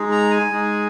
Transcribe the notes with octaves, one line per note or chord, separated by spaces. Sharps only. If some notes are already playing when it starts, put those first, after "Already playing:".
Already playing: G#3 D#4 G#4
A#5
G#5
G#3 D#4 G#4